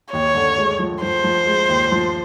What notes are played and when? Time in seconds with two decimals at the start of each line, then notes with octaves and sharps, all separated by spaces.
0.12 D#2 C#5
0.35 D3
0.58 G#3
0.79 F3
1.02 F3 C5
1.24 F3
1.47 G#3
1.69 D#2
1.92 F3